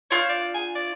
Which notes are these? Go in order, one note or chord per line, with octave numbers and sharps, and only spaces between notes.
D4 F4 C#5 G6
D5
G#5
D5